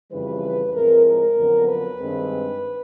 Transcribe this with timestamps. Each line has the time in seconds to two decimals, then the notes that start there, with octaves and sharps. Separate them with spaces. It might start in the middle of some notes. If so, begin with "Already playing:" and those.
0.12 F2 C#3 E3 G3 B4
0.74 A2 F3 G#3 C4 A#4
1.06 A#4
1.37 F2 D3 F#3 B3 D4
1.68 B4
1.99 G2 D#3 G#3 C4